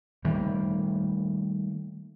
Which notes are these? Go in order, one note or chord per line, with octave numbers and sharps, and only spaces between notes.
D#3 G3 A3 A#3